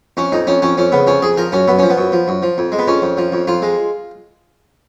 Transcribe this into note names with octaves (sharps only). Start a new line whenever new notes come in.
F2 C#4
F2 D#4
F2 C#4
F2 C#4
F2 C#4
C#3 B3
F2 C#4
F2 G#4
F3 A#4
F#2 C#4
F#2 B3
F3 C#4
B3
F#2
F3
F#2
F3
F2
G#3
B3
F2 C#4
F2
F3
F2
F2 F4
G#3